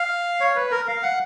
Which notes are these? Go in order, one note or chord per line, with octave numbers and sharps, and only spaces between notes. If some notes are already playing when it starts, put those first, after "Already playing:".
Already playing: F5
C#5
B4
A#4
F5
F#5